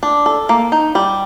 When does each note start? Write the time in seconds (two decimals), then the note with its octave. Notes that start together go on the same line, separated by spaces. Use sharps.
0.03 D4
0.26 A4
0.49 A#3
0.72 D#4
0.95 G3